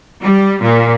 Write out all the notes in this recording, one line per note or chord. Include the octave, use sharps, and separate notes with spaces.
G3
A#2